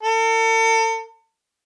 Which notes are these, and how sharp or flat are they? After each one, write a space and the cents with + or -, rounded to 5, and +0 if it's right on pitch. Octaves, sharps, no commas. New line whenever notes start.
A4 +40